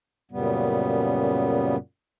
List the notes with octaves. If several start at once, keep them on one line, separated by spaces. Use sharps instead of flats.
F#2 A#2 C#3 G3 B3